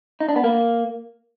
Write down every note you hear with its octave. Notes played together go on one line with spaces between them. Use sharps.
D#4
D4
B3
A#3